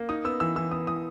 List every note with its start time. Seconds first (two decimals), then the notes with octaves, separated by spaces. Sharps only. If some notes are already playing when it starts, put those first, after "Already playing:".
Already playing: A#3
0.09 D#4 D#6
0.25 B3 E6
0.40 E3 E6
0.56 E3 E6
0.71 B3 D#6
0.87 E3 D#6